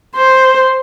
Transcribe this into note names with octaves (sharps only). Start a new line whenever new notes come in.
C5